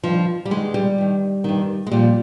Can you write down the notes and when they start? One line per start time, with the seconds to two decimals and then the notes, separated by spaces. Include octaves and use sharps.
0.03 G2 D#3 F3
0.45 G3
0.51 G2 D#3 G#3
0.74 G3
0.98 G2 D#3
1.44 G2 D#3
1.87 G#3
1.91 A#2 F3 G3